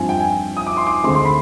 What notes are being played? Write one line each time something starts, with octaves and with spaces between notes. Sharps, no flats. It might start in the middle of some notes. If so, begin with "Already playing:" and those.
Already playing: G2 F3 C4 G#5
G5
G#5
D#6
D6
C6
D6
D2 D3 G#3 C4 C6
C6
B5